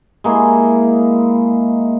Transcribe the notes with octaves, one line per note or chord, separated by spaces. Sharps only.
G#3 A#3 E4